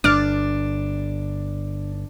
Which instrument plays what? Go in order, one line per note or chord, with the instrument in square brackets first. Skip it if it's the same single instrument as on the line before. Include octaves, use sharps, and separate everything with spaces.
[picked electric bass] G1 [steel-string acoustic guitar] D4 [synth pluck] D6 F6 A6